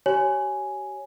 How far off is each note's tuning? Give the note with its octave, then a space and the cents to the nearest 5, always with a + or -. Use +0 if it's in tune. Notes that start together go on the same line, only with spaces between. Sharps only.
G4 -35 C#5 +0 G#5 +5